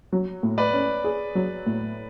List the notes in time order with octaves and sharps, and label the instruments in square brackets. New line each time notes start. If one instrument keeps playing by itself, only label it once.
[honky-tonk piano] F#3
A2
[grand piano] B4 D5
[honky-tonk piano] C#4
G#4
F#3
A2